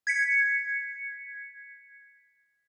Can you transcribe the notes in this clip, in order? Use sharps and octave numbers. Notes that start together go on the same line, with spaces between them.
G#6 B6 C#7